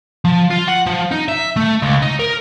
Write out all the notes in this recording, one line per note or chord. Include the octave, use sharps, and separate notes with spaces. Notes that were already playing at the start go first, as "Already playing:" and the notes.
F3
F4
F#5
F3
D#4
E5
A3
C#2
D#4
A#4